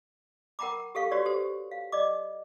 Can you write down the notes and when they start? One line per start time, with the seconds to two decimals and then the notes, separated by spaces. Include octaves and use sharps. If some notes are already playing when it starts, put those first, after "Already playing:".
0.59 A#4 F#5 G5 A#5 B5 D6
0.95 G4 A4 F5 C#6
1.11 F#4 G4 B4 C#5 D5
1.26 G4 A4 C5
1.71 F5
1.92 D5 D#5 D6